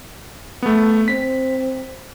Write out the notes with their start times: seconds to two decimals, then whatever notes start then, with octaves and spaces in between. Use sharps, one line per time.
0.62 A3 B3
1.08 C4 B6